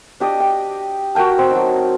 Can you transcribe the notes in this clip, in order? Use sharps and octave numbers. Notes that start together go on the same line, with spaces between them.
D4 G4 D#5
G5
F#4 A#4 G5 A5
C4 G5
F#3 D#4